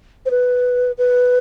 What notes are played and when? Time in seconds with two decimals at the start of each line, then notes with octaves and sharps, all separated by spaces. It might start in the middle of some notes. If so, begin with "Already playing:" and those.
0.26 C5
0.31 B4
0.98 B4